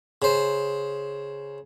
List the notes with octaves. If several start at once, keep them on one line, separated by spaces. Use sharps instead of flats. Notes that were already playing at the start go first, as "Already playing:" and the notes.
C#3 C5